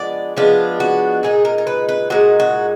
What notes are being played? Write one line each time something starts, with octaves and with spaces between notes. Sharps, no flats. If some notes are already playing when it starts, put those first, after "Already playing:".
Already playing: F3 G#3 B3 D4 D5
F3 G#3 B3 D4 F5
F#4
A#2 G#3 D#4 G#4
A#4
A#4
B4
B4
A#2 G#3 D#4 F#4
F#4